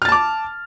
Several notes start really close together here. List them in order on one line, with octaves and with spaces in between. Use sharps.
F6 A6 A5 D6